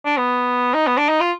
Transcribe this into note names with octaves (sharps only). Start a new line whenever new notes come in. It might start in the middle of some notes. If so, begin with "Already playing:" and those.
D4
B3
D#4
B3
D4
D#4
F4